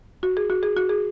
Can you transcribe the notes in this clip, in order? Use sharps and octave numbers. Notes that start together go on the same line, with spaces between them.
F#4
G#4
F#4
G#4
F#4
G#4